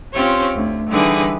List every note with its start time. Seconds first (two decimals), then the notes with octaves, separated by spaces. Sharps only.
0.12 C4 C#4 F4 G4 C5 C#5
0.54 D2
0.90 D3 E3 G3 D#4 G#4 B4